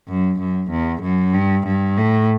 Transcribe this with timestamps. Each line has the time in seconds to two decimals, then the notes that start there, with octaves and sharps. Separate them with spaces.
0.08 F#2
0.39 F#2
0.71 E2
1.03 F#2
1.34 G2
1.66 G2
1.98 A2